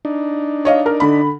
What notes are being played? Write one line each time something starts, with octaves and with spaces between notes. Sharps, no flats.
D4 D#4
C#5 D#5 F5
A#4
D3 B5